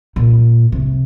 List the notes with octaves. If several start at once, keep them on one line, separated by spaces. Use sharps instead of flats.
A#2
C3